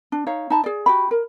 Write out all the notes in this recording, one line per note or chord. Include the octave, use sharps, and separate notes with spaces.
D4
D#4 C#5 F5
D#4 A5 B5
G#4 D5
F#4 G4 B5
A#4